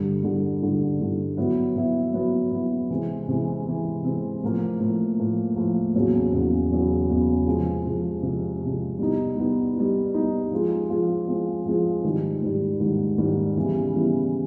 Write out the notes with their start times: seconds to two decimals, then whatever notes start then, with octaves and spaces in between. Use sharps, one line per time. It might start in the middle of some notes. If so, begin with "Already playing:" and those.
Already playing: G2 D3 G3
0.23 G2 D3 G3
0.62 G2 D3 G3
1.00 G2 D3 G3
1.37 F#3 B3 E4
1.76 F#3 B3 E4
2.14 F#3 B3 E4
2.52 F#3 B3 E4
2.90 C3 E3 G#3 C4
3.28 C3 E3 G#3 C4
3.67 C3 E3 G#3 C4
4.04 C3 E3 G#3 C4
4.43 A2 F3 A#3
4.80 A2 F3 A#3
5.19 A2 F3 A#3
5.56 A2 F3 A#3
5.94 E2 C#3 F#3 B3
6.33 E2 C#3 F#3 B3
6.71 E2 C#3 F#3 B3
7.09 E2 C#3 F#3 B3
7.47 C3 F3 G#3
7.85 C3 F3 G#3
8.23 C3 F3 G#3
8.61 C3 F3 G#3
8.99 G3 B3 D#4
9.37 G3 B3 D#4
9.76 G3 B3 D#4
10.14 G3 B3 D#4
10.51 F3 G#3 C4 F4 G#4
10.90 F3 G#3 C4 F4 G#4
11.28 F3 G#3 C4 F4 G#4
11.65 F3 G#3 C4 F4 G#4
12.04 G#2 D#3 G3
12.42 G#2 D#3 G3
12.80 G#2 D#3 G3
13.18 G#2 D#3 G3
13.56 C#3 E3 G3 B3
13.94 C#3 E3 G3 B3